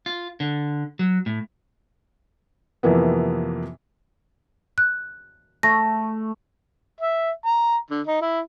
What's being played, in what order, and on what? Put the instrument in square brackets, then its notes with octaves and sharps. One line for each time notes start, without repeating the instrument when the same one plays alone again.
[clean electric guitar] F4
D3
F#3
A2
[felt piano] F2 C3 E3 A#3 B3
[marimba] F#6
[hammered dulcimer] A3 [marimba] A#6
[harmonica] E5
A#5
D3
D#4
E4